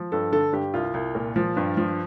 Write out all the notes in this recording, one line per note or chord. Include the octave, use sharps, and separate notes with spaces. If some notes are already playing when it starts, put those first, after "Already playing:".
Already playing: F3
G2 A4
D3 A4
G2 G4
C2 F4
C2
A#2
F3
G2
F3